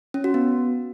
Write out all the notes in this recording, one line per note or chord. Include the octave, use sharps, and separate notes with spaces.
C#4
F#4
B3